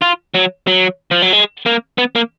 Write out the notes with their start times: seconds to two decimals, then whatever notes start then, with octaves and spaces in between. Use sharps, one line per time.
0.02 F4
0.34 F#3
0.67 F#3
1.11 F3
1.22 F#3
1.33 G#3
1.66 A#3
1.98 B3
2.15 A#3